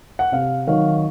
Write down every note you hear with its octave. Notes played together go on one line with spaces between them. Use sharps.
F#5
C3 F5
D#3 F#3 F5